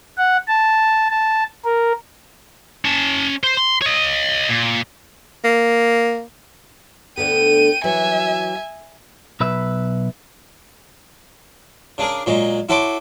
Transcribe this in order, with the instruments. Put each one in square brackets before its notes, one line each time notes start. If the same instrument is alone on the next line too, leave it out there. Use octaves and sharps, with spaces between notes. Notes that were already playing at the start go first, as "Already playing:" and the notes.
[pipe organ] F#5
A5
A5
A#4
[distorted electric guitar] C#4 A5
C5
C6
C#5 D#5
A#2
[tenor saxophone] A#3
[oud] D2 D3 B3 [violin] G5 D#7
[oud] E3 F#3 [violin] E5 G#5
[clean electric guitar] B1 B4 E5
[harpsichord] C#3 D4 G#4 A#4
A#2 F#3 G#3
E4 F#4 A4 C#5 C6 D6